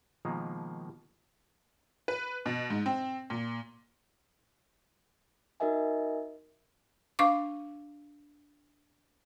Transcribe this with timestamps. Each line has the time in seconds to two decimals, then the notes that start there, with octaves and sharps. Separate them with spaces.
0.25 B2 D#3 F3 G#3 A#3
2.08 B4
2.46 B2
2.70 G#2
2.86 C4
3.30 A#2
5.60 D#4 F#4 A#4 D#5 E5 G#5
7.19 D4 F5 C#6 D6